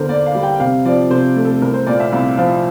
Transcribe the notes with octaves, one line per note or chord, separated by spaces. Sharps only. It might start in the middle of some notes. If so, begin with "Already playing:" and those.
Already playing: E2 D3 A#4 C5
A#3 D5
F5
G3
G5
C3 F5
F3 D5
C3 C5
A3
A4
C2 A#4
C5
A#2 D5
E5
C2 F5
F3 F5